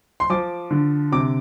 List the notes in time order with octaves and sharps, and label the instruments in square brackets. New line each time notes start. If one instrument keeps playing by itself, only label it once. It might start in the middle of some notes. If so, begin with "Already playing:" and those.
[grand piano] C6
F3 D6
D3
C3 D6